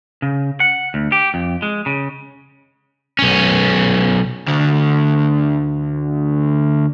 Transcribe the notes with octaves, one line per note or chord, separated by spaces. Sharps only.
C#3
F#5
D2
G4
F2
G#3
C#3
B1 C#4
D2 D3